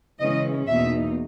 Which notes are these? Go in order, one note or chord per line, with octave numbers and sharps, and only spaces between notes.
C#3 E3 G#3 C#4 D#5
E2 B2 A#3 D#4 E5